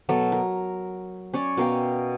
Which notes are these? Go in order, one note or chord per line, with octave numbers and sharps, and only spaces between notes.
B2 F#3 A4
A#4
C#4 C#5 D5
B2 A#4 F5 G5